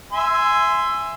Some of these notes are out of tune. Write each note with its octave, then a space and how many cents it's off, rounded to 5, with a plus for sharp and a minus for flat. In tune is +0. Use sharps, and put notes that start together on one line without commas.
E5 +10 G#5 +0 C6 -10